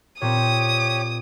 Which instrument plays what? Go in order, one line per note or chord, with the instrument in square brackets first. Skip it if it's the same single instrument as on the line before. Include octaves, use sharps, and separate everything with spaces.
[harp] A#2 C4 [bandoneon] G4 C#5 [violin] D#6